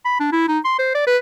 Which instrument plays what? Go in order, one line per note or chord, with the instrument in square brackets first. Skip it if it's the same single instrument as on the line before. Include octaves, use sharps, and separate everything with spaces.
[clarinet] B5
D4
E4
D#4
C6
C5
D5
B4